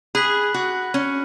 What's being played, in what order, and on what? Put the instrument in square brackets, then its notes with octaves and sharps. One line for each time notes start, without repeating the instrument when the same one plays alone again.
[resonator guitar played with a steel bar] G#4 [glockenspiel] B5 F#6 B6 F#7
[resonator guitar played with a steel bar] F#4
C#4